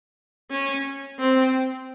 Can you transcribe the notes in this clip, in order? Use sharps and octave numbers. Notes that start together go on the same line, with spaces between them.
C#4
C4